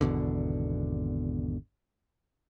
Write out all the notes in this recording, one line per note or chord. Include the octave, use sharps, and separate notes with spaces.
G#1 E2 B2 D3